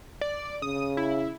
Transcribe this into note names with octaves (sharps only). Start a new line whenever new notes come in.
D5
C#3 D#6
E4